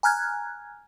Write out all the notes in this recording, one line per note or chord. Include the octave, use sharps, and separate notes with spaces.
G#5 A#5 F6 F#6 G#6